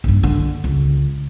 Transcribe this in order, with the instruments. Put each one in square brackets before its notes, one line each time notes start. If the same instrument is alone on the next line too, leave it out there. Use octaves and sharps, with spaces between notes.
[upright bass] A#1 G2
D3
C#2